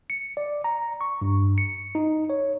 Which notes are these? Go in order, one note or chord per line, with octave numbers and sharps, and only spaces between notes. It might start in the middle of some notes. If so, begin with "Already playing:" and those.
C#7
D5
A#5
C#6
G2
C#7
D#4
C#5